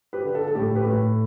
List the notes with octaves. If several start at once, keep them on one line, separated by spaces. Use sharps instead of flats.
G4 B4
D3
A4
A4
A2 G4
G4 B4
A2